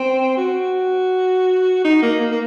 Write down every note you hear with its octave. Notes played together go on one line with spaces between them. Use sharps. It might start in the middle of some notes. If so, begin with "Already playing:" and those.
Already playing: C4
F#4
D#4
A#3
A#3
A#3